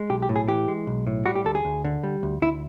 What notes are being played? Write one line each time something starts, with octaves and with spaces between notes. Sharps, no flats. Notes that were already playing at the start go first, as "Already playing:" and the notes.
Already playing: G#3
B1 G4
G4
A2
G#4
E3 G4
G#3
B1
A2
G3 F#4
G4
D2 A4
G#4
D2
D3
G3
D2
D2 E4